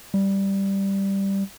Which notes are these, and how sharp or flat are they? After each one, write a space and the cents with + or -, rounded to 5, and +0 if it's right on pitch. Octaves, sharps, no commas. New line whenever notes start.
G3 +0